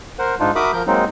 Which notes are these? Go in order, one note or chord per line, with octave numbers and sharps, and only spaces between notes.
A#4 C5 F#5
G#2 D4 D#4 F4
F#4 A#4 E5 B5 D6 D#6
F3 A#4 G6
F#3 G#3 A#3 C4 D#4